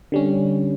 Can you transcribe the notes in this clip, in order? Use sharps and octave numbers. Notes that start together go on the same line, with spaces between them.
D3 G3 C#4